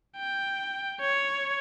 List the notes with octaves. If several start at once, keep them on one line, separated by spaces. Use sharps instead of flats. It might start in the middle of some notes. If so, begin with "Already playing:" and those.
G5
C#5